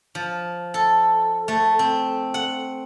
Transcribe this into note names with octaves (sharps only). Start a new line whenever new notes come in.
F3
A4
A3
C4
F#5